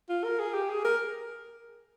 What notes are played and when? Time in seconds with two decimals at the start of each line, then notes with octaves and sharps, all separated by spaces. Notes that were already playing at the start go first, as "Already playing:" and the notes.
0.09 F4
0.24 A#4
0.39 G#4
0.54 G4
0.69 G#4
0.85 A#4